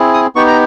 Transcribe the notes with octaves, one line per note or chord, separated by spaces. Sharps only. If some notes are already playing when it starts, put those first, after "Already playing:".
Already playing: C4 E4 G#4
D#6
B3 D#4 G4 C#6
A#5